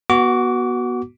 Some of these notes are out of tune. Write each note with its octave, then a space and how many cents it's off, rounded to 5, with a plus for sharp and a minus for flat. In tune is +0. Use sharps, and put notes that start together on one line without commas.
B3 -25 F#4 +0 D6 -25